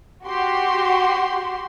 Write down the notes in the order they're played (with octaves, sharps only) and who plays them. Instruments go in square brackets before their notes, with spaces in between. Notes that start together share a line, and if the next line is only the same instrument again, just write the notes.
[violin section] F#4 G4 C6